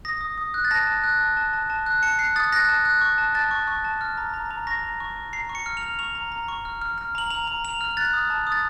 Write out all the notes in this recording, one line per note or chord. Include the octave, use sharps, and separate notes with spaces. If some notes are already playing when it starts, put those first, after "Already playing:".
D#6 A#6
D#6
D#6
F#6
A6
A5 A#6
A5
F#6
A5
A5
A5
A5
F#6
A5 C#7
F#6 C7
D#6 A6
F#6 A#6
A5
F#6
C#6
A5
A5 A6
C#6
C#6
A5
F6
A#5
A#5
A#5
C#6 A#6
A#5
C#6
C#6
A#5 C7
C#6
C#7
F6
F7
F6
C#6 F7
A#5
A#5
C#6
F6
F6
F6
A#5 F#7
A#5 F7
A#5
A#5 F7
F6
F#6 A6
D#6
A5
D#6
A6